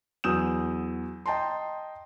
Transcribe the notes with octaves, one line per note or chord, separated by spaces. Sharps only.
E2 F#3 D#6 E6 G6 E7
D#5 G5 A5 A#5 C6